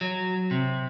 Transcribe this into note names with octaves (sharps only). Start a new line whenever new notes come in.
F#3
C3